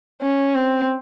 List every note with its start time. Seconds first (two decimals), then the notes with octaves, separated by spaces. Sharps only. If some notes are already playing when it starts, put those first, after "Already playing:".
0.22 C#4
0.55 C4